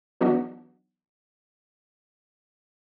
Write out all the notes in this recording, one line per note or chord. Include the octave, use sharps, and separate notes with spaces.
E3 F#3 B3 D4 D#4 F#4